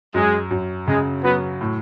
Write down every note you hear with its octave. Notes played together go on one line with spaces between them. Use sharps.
F#2 G#3
F#2
C#3 G#3
F#3 B3
A2